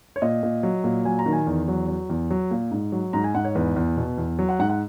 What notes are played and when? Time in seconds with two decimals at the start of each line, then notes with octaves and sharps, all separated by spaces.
0.16 C#5
0.22 A#2 D#5
0.43 A#2
0.63 F#3
0.84 A#2
1.05 F#3 G#5
1.19 A#5
1.26 D#3
1.33 G#5
1.47 E2
1.68 F#3
1.88 F#3
2.09 E2
2.31 F#3
2.51 A#2
2.71 G#2
2.92 F#3
3.13 G#2 A#5
3.24 G#5
3.35 G#2 F#5
3.44 C#5
3.55 E2 B4
3.76 E2
3.97 B2
4.18 E2
4.39 F#3
4.49 F#5
4.59 G#2 F#5
4.70 F#5